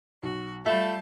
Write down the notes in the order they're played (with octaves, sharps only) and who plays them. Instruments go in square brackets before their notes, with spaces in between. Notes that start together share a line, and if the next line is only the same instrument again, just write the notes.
[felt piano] B1 [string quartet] F#4
[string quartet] G3 A5 G6 [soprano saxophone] A3 [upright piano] F4 B5 [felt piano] E5